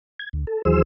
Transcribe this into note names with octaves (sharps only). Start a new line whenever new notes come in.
G#6
D2
A4
D#2 E3 F#3 G#4 C5 E6